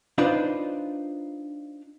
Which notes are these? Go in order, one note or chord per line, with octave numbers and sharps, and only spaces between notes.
D4 D#4 F4 B4 C5 D5